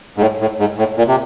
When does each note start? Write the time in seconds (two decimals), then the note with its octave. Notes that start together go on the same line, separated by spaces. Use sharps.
0.17 G#2
0.21 A2
0.41 A2
0.60 G#2
0.78 A2
0.98 A#2
1.08 C3